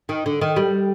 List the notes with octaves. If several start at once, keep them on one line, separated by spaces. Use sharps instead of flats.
D#3
D3
D#3
G3